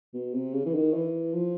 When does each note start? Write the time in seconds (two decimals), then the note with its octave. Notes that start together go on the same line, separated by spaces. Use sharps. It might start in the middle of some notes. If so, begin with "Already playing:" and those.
0.14 B2
0.34 C3
0.53 C#3
0.66 E3
0.75 D#3
0.94 E3
1.33 F3